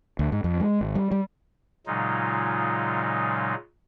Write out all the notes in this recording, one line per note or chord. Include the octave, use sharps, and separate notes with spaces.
D2
G#2
F2
G#3
G#1
G3
G3
A#2 C#3 F#3 G#3 D#4 F4